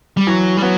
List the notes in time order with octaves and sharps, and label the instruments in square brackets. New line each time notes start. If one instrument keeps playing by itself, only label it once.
[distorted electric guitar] G3
[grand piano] E3 [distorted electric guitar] F#3
[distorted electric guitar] G3
[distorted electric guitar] F#3 [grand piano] B3